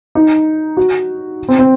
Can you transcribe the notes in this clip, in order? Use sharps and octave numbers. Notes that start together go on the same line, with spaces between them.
D#4
F#4
C4
C4